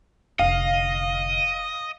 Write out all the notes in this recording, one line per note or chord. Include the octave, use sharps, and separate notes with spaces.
F1 D3 D#5 F5